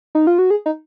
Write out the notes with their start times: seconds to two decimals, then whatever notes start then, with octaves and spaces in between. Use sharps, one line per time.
0.15 D#4
0.27 F4
0.39 F#4
0.50 G#4
0.66 D#4